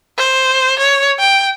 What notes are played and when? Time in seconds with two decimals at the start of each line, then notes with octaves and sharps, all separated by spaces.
0.18 C5
0.79 C#5
1.19 G5